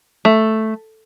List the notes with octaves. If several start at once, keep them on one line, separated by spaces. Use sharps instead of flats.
A3